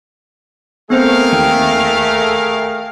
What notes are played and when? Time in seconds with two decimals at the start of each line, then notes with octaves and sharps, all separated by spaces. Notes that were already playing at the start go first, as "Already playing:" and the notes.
0.90 A3 B3 C4 G#4 A#4 C5 F5
1.33 D#2 G5